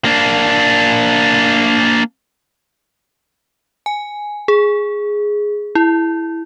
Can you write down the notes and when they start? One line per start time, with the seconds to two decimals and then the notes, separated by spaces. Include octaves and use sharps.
0.05 A#3 D4
3.86 G#5
4.48 G#4
5.75 E4